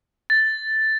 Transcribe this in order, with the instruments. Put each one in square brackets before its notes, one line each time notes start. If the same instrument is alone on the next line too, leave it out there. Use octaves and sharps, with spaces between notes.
[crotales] A6